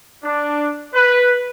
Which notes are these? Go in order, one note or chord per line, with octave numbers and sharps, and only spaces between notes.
D4
B4